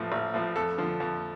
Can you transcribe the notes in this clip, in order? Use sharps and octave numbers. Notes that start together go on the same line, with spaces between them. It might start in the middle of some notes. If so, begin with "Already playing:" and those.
Already playing: A1 A2 F3
A1
A2 F3
F2 A4
D3 F3
F2